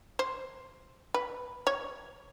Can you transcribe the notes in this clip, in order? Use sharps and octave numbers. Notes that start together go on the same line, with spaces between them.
C5
B4
C#5